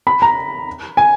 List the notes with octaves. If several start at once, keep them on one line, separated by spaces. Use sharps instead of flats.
B5
A#5
G#5